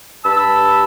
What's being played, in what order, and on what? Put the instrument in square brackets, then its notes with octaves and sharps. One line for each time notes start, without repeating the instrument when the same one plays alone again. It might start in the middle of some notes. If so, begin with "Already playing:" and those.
[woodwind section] G2 A5 B5 E6